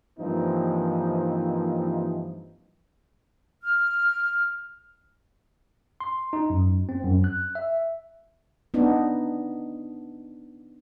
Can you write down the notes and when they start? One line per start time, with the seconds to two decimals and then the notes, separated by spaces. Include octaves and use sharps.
0.19 G2 E3 F3 A#3 C4 D#4
3.63 F6
6.00 C6
6.33 D#4
6.50 F#2
6.89 C4
7.04 F#2
7.24 F#6
7.55 E5
8.74 B3 D4 D#4